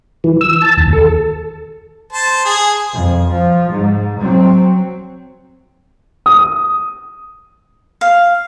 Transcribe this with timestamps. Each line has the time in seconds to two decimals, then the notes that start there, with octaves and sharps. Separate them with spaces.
0.24 E3
0.41 E6
0.62 A5
0.77 D#2
0.93 A4
2.13 C5 A5
2.45 G#4
2.93 F2
3.30 F3
3.71 G#2
4.20 F#3 C4
6.26 D#6
8.01 F5